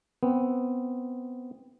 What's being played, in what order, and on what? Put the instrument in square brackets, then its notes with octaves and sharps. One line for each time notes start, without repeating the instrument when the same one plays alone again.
[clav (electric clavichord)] B3 C4